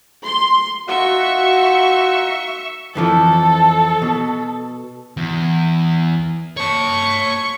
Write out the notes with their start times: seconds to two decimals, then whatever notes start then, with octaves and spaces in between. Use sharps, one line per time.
0.23 C6
0.88 D#4 F4 F#4 E5 C#6
2.95 F2 E3 F3 A4
4.02 B2
5.17 E2
6.57 C#5 A5 C#6